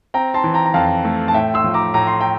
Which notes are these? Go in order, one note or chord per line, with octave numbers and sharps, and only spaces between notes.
C4 G5 A#5
A5 C6
E3
G5 A#5
A#5
F2 F5 A5
A3
A5
A2 E5 G5
C6 E6
F3
A#5 D6
A2 A#5
C6
G5 A#5